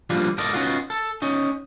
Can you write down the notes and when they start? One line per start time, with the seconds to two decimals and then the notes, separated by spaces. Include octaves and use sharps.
0.10 F3 G3 A#3 D4 F4
0.38 G#3 A4 A#4 D5 D#5
0.53 B3 C#4 D#4 F4 F#4
0.90 A4
1.22 C#4 D#4